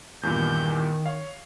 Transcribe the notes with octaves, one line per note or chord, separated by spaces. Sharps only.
E2 G2 A#2 D#3 G6
C#5 F5